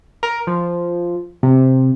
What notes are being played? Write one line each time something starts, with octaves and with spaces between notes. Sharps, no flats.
A#4
F3
C3